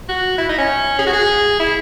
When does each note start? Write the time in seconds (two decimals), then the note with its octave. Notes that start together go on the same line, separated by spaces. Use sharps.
0.08 F#4
0.38 E4
0.49 D#4
0.58 C#4
0.99 G#4
1.07 F#4
1.13 G#4
1.60 E4